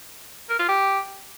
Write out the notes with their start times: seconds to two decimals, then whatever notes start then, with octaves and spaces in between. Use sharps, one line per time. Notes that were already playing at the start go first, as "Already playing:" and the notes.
0.50 A#4
0.59 F4
0.68 G4